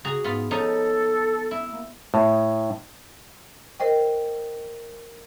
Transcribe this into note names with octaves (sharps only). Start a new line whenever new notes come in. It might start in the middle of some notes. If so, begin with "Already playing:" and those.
C#3 F#4 G#4 A#5
G#2 B3 F4
F3 D#4 A4 C#5
E4
A#3
A2
A#4 C5 D#5 G5